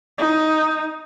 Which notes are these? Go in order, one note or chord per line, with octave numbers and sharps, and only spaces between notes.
D#4